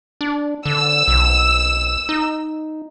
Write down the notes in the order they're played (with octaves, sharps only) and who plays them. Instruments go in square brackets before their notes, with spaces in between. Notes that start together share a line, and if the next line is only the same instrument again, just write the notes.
[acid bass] D4
[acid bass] D3 [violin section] E6
[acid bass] B1
D#4